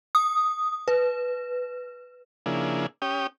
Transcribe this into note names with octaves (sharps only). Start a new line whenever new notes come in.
D#6
B4
C#3 F3 A#3 D4 E4 G#4
C#4 G4 G5 D#6